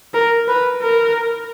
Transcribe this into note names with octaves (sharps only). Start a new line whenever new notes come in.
A#4
B4
A#4